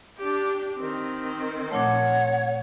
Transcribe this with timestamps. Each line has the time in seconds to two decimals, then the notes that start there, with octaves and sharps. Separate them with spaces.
0.18 D4 G4
0.78 D#3 C4
1.71 A#2 F3 A3 C#5 F#5